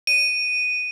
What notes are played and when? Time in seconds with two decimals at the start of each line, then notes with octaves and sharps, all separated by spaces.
0.07 D#7